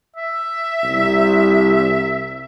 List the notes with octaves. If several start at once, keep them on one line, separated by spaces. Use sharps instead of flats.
E5
C2